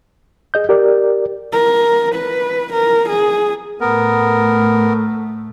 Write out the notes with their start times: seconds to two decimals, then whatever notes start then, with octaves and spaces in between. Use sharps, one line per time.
0.54 G#4 D#5 G6
0.69 G4 A#4 D5
1.53 A#4
2.15 B4
2.73 A#4
3.09 G#4
3.81 A2 A3 B3 A#4